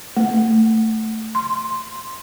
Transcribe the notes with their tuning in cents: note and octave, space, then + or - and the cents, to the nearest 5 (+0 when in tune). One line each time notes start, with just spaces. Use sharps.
A3 +10
C6 +5